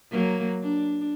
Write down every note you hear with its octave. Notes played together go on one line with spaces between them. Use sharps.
F#3 A#3
D4